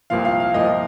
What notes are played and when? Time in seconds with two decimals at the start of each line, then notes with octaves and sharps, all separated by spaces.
0.10 C2 A#2 F3 F5
0.25 F5
0.40 F5
0.54 C2 A#2 F3 D#5